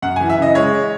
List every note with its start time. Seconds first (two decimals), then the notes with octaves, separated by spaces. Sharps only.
0.02 F#2 F#5
0.16 G#5
0.20 E3
0.30 E5
0.38 C#3 D#5
0.55 G#3 C#5